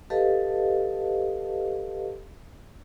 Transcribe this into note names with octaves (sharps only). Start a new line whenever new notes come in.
G4 A4 B4 D#5 F5 A5